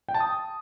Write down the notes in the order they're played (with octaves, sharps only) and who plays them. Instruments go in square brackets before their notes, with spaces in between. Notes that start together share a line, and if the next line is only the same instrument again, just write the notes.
[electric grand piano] G5
A5
D#6